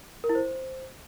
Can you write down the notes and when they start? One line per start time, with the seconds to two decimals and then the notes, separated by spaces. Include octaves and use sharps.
0.24 A#4
0.29 E4
0.35 C5